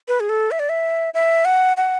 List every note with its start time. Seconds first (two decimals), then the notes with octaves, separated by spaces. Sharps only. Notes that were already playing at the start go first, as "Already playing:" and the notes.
0.08 B4
0.20 G#4
0.29 A4
0.51 E5
0.59 D5
0.69 E5
1.14 E5
1.45 F#5
1.77 F#5